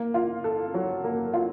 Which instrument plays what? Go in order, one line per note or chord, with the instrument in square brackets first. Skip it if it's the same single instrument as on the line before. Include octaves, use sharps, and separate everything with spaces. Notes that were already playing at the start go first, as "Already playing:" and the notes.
Already playing: [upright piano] A#3
F4
A4
F#3
A#3
F4